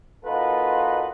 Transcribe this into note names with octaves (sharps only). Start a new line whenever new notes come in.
A#3 D#4 F4 F#4 A4 B4